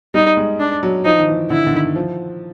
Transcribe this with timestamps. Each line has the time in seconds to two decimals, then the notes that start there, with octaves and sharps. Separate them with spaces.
0.14 G3 D#4
0.37 G#3
0.60 D4
0.83 F#3
1.05 F3 D#4
1.18 D#3
1.28 E3
1.50 D3 E4
1.66 D3
1.73 D#3
1.96 F3